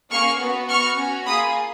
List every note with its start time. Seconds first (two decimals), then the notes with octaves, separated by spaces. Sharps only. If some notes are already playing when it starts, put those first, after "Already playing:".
0.11 A#3 C#4 G#4 C#6 F6
0.40 B3 F#4
0.69 B3 F#4 C#6 F6
0.98 C#4 F#4
1.26 A#3 F4 G#4 B5 D#6